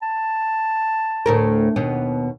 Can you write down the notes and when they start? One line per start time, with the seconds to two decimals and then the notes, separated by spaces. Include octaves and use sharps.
0.02 A5
1.26 D2 A2 A#4
1.76 D#2 B2 B3